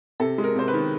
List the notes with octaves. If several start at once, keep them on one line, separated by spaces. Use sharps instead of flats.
C3 A4
G#3
A#4
C3 C5
B4
D#3